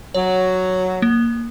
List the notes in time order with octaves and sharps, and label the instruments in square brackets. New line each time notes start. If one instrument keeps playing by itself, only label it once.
[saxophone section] F#3 [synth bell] C#5
[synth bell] A#3